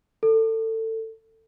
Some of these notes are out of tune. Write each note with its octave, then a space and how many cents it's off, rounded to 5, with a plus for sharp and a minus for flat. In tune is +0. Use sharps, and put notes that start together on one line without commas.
A4 +25